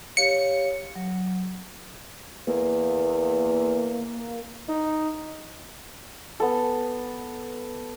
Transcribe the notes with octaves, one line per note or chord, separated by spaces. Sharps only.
G4 C#5 F5 C#7
F#3
E2 A#3
D#4
B3 A4